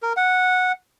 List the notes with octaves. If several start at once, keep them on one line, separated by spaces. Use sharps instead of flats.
A#4
F#5